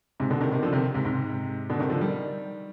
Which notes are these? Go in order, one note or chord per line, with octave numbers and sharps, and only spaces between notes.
G#2 C3
B2 D3
C3 D#3
C3 D#3
D3 F3
C3 D#3
G#2 C3
G#2 C3
B2 D3
C3 D#3
D3 F3
D#3 G3